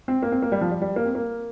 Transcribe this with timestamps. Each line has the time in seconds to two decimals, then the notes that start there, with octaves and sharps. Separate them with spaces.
0.08 C4
0.23 A#3
0.32 C4
0.42 A#3
0.52 G3
0.61 F3
0.71 G3
0.81 G3
0.96 A#3
1.05 C4
1.15 A#3